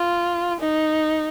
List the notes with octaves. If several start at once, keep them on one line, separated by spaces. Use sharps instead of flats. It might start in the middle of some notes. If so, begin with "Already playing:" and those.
Already playing: F4
D#4